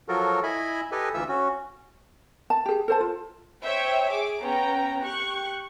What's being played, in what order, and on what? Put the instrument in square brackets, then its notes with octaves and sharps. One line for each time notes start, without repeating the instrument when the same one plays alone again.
[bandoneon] F3 F#3 F4 F#4 A4 A#4
E4 D#5 E5 G#5 B5
G4 A4 B4 D#5 G#5
D2 E3 F4 E5 E6
C#4 F#4
[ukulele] A5
G4 G#4
A4 C5 A5
F4
[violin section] C5 C#5 E5 G5
G#4 D6
B3 C#4 G5 A#5
G4 C#6 F#6